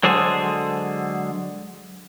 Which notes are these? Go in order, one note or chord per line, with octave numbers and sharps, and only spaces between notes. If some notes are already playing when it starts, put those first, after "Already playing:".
D3 F#3 G#3 G#4 A4 C5